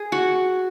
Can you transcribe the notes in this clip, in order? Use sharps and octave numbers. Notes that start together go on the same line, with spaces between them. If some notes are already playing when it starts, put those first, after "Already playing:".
Already playing: G#4
F#4